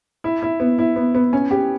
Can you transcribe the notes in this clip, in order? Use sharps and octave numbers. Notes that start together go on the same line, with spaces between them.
E4
E4
B3
E4
B3
B3
C#4
G4